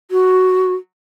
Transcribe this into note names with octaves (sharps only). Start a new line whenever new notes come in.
F#4